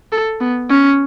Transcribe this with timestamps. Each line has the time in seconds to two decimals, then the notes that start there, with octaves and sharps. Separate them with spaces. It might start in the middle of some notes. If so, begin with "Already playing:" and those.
0.12 A4
0.40 B3
0.70 C#4